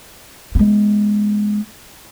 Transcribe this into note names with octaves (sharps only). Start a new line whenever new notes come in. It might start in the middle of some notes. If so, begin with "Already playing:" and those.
G#3 B3